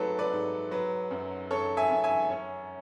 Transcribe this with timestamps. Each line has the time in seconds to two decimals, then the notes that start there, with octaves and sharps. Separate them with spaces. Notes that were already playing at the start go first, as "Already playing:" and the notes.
Already playing: G#2 F#3 A3 A4 B4
0.19 B4 D5
0.31 G#2
0.71 F#3 B4
1.11 F#2
1.51 F#2 A4 C#5
1.77 E5 G#5
1.90 F#2
2.04 E5 G#5
2.30 C#4